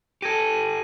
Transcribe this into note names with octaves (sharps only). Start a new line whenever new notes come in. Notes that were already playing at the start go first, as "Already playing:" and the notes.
G4 A4 G#6 A#6 D#7